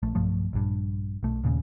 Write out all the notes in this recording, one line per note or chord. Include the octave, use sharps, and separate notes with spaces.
A#1 A3
B1 G2 F3 A3
A#1 G2
B1 A3
D#2 A#2 C#3